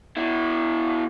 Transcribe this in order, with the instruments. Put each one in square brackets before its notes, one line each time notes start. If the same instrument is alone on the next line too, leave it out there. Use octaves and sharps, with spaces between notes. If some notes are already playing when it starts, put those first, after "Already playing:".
[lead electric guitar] B2 E4